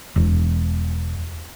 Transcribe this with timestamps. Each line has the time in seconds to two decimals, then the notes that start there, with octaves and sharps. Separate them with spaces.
0.16 E1